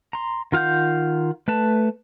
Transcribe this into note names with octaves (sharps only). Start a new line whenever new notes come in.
A#5 C6
D#3 F4 F5 F#5 G6
A3 B4 A5